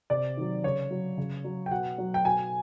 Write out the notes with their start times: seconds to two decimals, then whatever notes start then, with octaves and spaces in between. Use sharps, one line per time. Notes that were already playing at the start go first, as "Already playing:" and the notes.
0.10 C3 D5
0.37 D#3 F#3
0.64 C#3 C#5
0.91 F#3
1.18 C#3
1.44 F#3
1.66 G5
1.71 B2 F#5
1.98 F#3
2.14 G5
2.25 B2 G#5